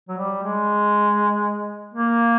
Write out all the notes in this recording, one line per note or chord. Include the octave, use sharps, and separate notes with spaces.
F#3
G3
G#3
A#3